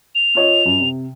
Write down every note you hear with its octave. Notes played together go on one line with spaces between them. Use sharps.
F7
F4 C#5 D#5
F#2
C3